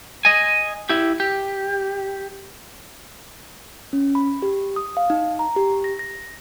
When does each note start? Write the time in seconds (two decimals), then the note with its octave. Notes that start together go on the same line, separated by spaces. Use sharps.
0.25 D#5 G#5
0.89 E4 G4
1.20 G4
3.93 C#4
4.15 B5
4.42 G4
4.76 D#6
4.97 F5
5.10 D#4
5.39 A#5
5.56 G4
5.84 A#6
5.99 A#6